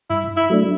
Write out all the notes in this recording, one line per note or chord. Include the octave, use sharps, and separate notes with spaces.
G2 E4
E4
F#3 A3 D4